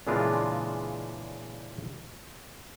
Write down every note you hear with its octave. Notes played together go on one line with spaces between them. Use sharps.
A#2 C#3 E3 G#3 D4 F4